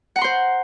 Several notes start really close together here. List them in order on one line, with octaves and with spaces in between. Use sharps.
F#5 A#5 C6 C5